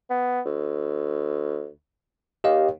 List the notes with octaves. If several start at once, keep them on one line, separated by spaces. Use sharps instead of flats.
B3
D2
D#2 G4 D#5 F5